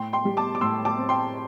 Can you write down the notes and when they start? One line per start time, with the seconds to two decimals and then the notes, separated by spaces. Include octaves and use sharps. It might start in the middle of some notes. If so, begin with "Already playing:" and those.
Already playing: A2 G5 C6
0.13 G5 C6
0.25 G3
0.37 A5 D6
0.55 D6
0.61 A2 C6 E6
0.85 A5 D6
0.97 C4
1.09 G5 C6